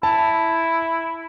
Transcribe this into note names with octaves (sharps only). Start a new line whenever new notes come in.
E4 A5